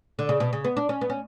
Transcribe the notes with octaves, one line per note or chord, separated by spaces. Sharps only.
D3
C#3
B2
C#3
B3
D4
C#4
B3
C#4